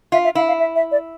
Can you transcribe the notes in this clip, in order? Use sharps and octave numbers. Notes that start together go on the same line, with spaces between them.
F4 E5
E5
E4 F5
F5
E5
E5
D5